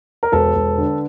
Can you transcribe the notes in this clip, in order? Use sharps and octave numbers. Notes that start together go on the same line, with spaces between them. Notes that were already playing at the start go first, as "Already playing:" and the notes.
A#4
E1 A4 B4
E1
D3